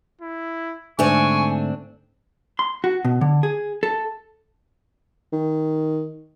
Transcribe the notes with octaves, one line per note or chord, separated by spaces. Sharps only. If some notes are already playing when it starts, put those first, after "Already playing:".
E4
G#2 D3 A3 C4 D4 G#5 C#6
C6
F#4
B2
D3
G#4
A4
D#3